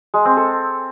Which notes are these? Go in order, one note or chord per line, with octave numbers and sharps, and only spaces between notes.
G#3
C4
A4